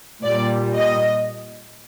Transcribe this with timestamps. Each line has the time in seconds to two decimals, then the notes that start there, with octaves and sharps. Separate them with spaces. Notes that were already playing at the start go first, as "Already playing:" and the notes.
0.23 A#2 G3 D5
0.75 D#5